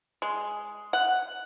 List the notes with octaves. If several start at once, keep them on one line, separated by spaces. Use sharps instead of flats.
G#3
F#5